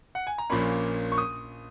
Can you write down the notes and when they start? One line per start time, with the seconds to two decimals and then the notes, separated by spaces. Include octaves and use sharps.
0.15 F#5
0.27 G#5
0.38 A#5
0.50 A#1 A#2 A#3 C#4 B5
1.12 C#6
1.18 D#6